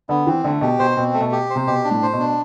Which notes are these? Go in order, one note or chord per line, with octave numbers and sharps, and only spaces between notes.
D3 B3
E3 C4
D3 A3
B2 G4
B2 C5
B2 C4
A3
B2
G4
C5
C3
B2 G4
D4
A2
C5
B2
D4